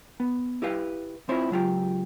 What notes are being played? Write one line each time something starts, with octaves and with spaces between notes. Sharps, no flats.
B3
E4 G4 B4 F5
C4 E4 F4 C5 C#5
C#2 F#3 F4 G4